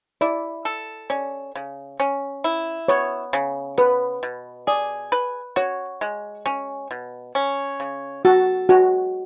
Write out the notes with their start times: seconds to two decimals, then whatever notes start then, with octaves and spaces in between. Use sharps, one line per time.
0.21 E4 D5
0.65 A4
1.10 C#4 D5
1.55 C#3
2.00 C#4
2.44 E4
2.88 B3 C#5
3.33 C#3
3.78 B3 B4
4.23 B2
4.67 G#4 D5
5.12 B4
5.56 F#4 C#5
6.01 G#3
6.46 C#4 C#5
6.91 B2
7.35 C#4
7.80 C#3
8.25 F#4 A4
8.69 G#3 F#4